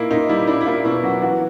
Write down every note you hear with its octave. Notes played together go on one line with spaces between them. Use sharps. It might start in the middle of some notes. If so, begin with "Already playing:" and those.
Already playing: A#2 A#3 D#4 E4
A#2 D#4
G3 E4
D4 E4
E4
A#3 F4
B2 E4
F#3 F#4
E3 F#4